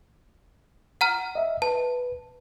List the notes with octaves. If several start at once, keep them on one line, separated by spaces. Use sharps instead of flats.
F#5 A#5 F6
D#5 E5
B4 A5